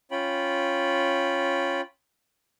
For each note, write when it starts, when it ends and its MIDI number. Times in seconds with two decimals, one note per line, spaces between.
0.11 1.81 61
0.11 1.81 65
0.11 1.81 79
0.11 1.81 83